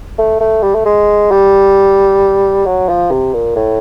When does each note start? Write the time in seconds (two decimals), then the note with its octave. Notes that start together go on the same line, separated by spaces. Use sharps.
0.19 A3
0.40 A3
0.63 G3
0.75 A3
0.86 G#3
1.31 G3
2.66 F#3
2.89 F3
3.11 C3
3.34 A#2
3.56 A2